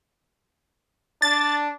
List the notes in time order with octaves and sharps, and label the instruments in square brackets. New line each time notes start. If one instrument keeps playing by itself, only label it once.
[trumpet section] D4 [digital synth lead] A6